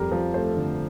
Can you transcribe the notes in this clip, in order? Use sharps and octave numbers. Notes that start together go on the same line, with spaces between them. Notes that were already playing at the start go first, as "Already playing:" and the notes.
Already playing: F2 G3 G4 A#4
F3
A3 A4 C5
D3